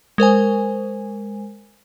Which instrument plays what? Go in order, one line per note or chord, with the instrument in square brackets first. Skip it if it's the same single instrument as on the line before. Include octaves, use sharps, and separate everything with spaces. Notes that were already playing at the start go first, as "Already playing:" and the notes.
[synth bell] G#3 A#4 C5 G#5